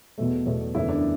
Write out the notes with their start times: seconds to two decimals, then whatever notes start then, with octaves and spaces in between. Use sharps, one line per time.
0.18 E2 B2 A3
0.46 E2 B2 A3
0.74 F#1 E2 E3 A3 E4
0.89 D4